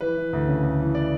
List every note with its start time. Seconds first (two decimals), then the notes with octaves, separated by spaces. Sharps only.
0.01 E3 B4
0.17 E3
0.33 D2
0.47 C#3
0.63 D2
0.79 E3
0.95 D5